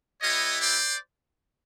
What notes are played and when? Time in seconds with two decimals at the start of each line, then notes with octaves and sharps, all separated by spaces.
0.21 B3 E4 G4 C#5 D#5
0.61 C5 D5